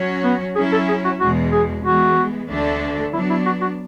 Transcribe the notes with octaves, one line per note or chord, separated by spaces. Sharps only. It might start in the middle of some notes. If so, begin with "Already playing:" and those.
Already playing: F#3 C#4 F#4 C#5
B3
F#3 C#4 E4 G#4
A4
G#4
F#4
E2 B2 G#3 F#4
G#4
E3 G#3 B3 F#4
D2 D3 A3 D4 A4
F#3 B3 D4 E4
E4
F#4
F#4